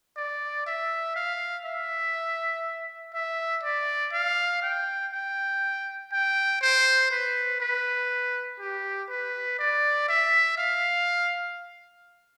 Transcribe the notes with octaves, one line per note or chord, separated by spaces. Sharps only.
D5
E5
F5
E5
E5
D5
F5
G5
G5
G5
C5
B4
B4
G4
B4
D5
E5
F5